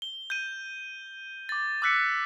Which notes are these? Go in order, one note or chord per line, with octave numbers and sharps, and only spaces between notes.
G7
G6 D#7
D6 A6
D6 E6 F#6 B6 C#7